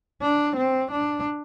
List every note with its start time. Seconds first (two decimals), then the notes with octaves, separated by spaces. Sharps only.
0.21 D4
0.56 C4
0.91 D4